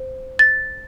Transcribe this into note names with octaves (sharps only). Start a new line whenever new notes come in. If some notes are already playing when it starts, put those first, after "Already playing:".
Already playing: C5
A6